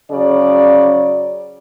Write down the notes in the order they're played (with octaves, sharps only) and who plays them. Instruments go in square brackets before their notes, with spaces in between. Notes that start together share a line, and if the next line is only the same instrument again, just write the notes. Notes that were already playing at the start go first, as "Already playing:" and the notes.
[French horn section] C#3 F#3 D5